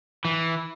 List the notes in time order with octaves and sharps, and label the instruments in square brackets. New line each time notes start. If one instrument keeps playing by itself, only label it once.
[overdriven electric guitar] E3